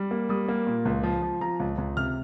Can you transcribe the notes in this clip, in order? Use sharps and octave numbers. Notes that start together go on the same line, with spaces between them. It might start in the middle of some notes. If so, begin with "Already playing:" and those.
Already playing: G3
A#3
G3 D#6
A#3
A#2
C#2
F3
F3
F3 A#5
C#2
C#2
C3 F6